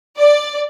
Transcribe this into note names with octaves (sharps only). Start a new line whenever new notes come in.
D5